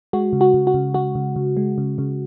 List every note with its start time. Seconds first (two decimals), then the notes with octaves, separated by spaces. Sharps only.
0.13 G#3 F#4
0.33 C#3
0.41 F#4
0.54 C#3
0.67 F#4
0.74 C#3
0.94 C#3 F#4
1.15 C#3
1.36 C#3
1.57 G#3
1.78 C#3
1.98 C#3